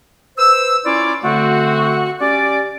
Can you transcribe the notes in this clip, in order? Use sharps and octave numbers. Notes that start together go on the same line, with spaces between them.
B4 C5 E6
C#4 E4 F4 C#5 D5
D3 A3 C4 F#4
C#4 G4 D5